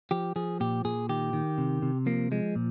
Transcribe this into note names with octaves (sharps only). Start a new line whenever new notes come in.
F3 G4
F3 G#4
A#2 G4
A#2 G#4
D#3 G4
D#3
C3
C3
F3 A#3
F3 G#3
A#2